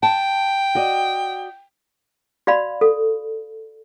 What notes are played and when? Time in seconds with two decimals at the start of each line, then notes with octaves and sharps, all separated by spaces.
0.03 G5 A5
0.75 F#4 D5 D#5
2.47 F#4 D5 F5 B5
2.81 A4